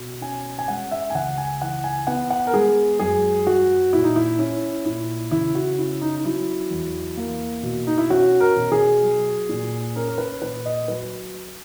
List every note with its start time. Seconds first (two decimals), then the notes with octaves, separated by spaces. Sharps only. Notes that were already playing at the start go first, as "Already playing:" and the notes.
Already playing: B2
0.21 C#4 G#5
0.59 G#5
0.68 G#3 F#5
0.92 E5
1.10 G#5
1.15 C#2 F#5
1.38 G#5
1.61 E3 F#5
1.84 G#5
2.07 B3 F#5
2.30 F#5
2.47 A#4
2.54 G#3 G#4
2.99 F#2 G#4
3.46 F#3 F#4
3.93 A#2 E4
4.04 D#4
4.16 E4
4.39 C#4 E4
4.85 A#2 E4
5.31 C#3 E4
5.55 F#4
5.78 C#4 E4
6.01 D#4
6.17 D#4
6.24 F#3 E4
6.71 E2
7.17 A#3
7.63 B2
7.87 D#4
7.98 E4
8.10 C#4 F#4
8.40 A#4
8.56 B2
8.72 G#4
9.02 F#3
9.49 A#2
9.96 C#4 A#4
10.08 A#4
10.18 B4
10.42 A#2 B4
10.65 D#5
10.88 F#3 B4